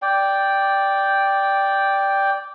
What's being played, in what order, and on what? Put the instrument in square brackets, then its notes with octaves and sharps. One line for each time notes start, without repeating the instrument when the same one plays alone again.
[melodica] D5 G5